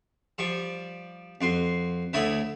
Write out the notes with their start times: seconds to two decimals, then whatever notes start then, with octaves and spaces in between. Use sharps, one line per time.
0.38 F3 G3 C#6
1.41 F2 F#4 C6
2.13 D2 A3 E4 C#5 B5 D#6